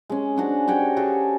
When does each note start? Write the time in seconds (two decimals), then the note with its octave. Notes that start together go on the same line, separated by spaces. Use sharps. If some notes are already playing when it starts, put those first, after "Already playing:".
0.09 G#3 C#4
0.36 C#4 D4 F#4 C5
0.67 F#4 G4 C#5 G5
0.97 F#4 G#4 A4